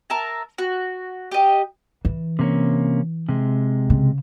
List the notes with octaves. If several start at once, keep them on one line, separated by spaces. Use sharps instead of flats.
A#4 E5 A5
F#4
G4 D#5
E3
C3 A#3 C#4
C3 G#3
C#3